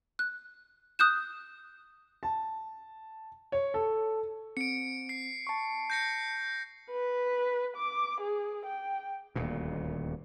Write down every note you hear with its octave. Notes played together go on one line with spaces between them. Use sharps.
F#6
D#6 F#6 G6 E7
A5
C#5
A4
C4 C#7 D7
C7
A5 C#6
G6 A#6 C#7
B4
D6
G#4
G5
D#1 D2 A#2